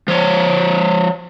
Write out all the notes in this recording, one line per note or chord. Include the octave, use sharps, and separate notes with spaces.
F3 C#5